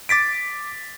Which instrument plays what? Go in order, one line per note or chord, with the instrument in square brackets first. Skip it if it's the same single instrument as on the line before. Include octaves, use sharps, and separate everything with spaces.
[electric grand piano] D6 A6 B6 D7